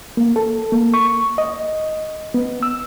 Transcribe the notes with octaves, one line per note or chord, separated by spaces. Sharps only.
A#3
A4
A#3
C#6
D#5
B3
E6